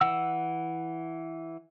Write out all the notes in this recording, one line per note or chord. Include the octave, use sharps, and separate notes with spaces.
E3 F#5 E6